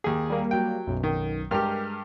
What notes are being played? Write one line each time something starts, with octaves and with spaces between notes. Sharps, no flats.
D#2 G4 G#4
G3 A#3
F#3 G5
B1 F#2
D#3
G2 G#3 G4 A#4 F6